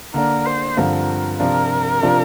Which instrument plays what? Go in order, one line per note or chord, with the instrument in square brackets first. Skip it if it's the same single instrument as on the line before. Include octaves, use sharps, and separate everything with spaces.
[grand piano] D3 A#3 D4 [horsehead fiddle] A#4
[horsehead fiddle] C5
[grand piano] G2 D3 F3 C4 F4 [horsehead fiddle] A#4
[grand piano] C3 F3 D4 F4 [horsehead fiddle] A#4
[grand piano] C3 F3 D4 F4